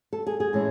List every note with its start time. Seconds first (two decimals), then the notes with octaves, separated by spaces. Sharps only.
0.13 A4
0.27 G#4
0.40 G#4
0.53 A2 E3 G#3 C#4